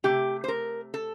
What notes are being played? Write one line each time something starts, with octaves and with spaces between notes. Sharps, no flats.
C3 F3 A3 G4
C5
A#4
A4